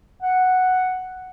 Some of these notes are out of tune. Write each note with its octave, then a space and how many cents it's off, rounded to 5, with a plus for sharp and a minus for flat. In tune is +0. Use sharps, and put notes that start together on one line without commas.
F#5 +0